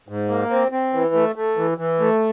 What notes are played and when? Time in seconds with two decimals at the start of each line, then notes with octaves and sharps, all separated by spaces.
0.09 G#2
0.29 A#3
0.50 C4
0.72 C4
0.93 E3
1.14 A3
1.36 A3
1.57 E3
1.78 E3
2.00 A3